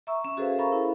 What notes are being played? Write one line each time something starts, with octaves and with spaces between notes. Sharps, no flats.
E5 A#5 C#6 E6
C#4
F#4 G#4 A4 B4 C5 F5
A4 A#4 F5 A#5 B5 C#6
E4